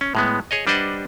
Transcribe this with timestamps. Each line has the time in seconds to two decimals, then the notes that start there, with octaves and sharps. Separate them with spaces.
0.01 C#4
0.15 A2 G#3 B3
0.51 G#4 C#5 D#5
0.67 G3 D4 B4 C5 D#5 F#5